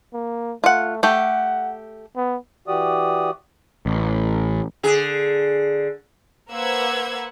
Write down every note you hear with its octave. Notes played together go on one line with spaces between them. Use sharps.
A#3
A3 F4 F#5
A3 G4 F#5
B3
E3 F#4 G4 D5 D#6
A1
D3 G#4
A#3 B4 C5 F#5 E6 G#6